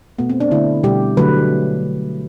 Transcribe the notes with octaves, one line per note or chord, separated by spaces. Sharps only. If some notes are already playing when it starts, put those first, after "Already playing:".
B2 A3 B3
C4
D4
D3 A3 E4
B2 G3 G4
D3 F#3 A3 B4